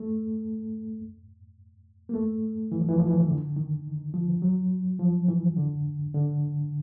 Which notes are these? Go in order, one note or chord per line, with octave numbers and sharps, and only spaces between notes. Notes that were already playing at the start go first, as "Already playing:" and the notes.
Already playing: A3
A#3
A3
E3
F3
E3
F3
E3
D#3
D3
D#3
F3
F#3
F3
E3
D3
D3